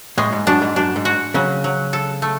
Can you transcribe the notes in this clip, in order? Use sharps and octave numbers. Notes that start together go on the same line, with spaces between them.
A2 G#3
G#2
F#2 D4
G#2
F#2 D4
G#2
F#4
C#3 F#3
F#3
A4
A3